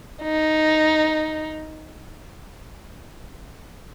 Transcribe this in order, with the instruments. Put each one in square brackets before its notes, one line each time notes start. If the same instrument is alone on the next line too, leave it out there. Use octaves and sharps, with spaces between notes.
[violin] D#4